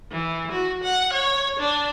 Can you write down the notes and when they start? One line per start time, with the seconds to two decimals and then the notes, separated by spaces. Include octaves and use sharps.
0.11 E3
0.51 F#4
0.83 F#5
1.13 C#5
1.59 D4